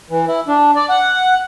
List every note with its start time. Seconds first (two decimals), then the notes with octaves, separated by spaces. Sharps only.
0.10 E3
0.28 E4
0.48 D4
0.76 D5
0.90 F#5